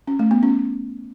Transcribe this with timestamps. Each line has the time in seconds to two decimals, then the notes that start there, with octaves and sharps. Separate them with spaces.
0.07 C#4
0.19 A3
0.31 B3
0.43 C#4